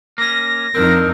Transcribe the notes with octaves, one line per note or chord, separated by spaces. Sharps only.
A#3 C#4 A#6
F2 C4 D4 D#4 A#4